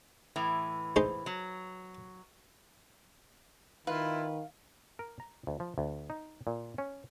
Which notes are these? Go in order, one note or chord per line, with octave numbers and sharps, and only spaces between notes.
A2 E3
G#3 D#4 C5
F#3
D#3 E4 F4 B4 F5
A#4
A#5
D2
F3
D2
D#4
A#2
C#4